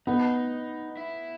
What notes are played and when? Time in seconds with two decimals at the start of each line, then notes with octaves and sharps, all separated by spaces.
0.07 B3 D#4
0.97 E4